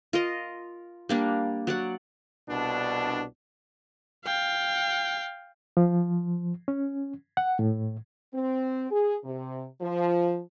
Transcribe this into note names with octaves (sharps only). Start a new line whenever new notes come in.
F4 A#4 D#5
G3 A#3 D4
F#3 D5 F#5
C2 B2 D4
F5 G5
F3
C#4
F#5
A2
C4
G#4
C3
F3